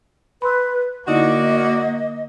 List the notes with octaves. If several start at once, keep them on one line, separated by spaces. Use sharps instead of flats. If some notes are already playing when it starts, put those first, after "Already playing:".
B4 B5 C6 E6
D3 A#3 D#4 E4 F#4 D5 D#5